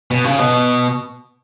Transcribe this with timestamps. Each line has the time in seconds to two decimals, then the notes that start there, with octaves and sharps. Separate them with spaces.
0.11 B2
0.24 C#3
0.39 B2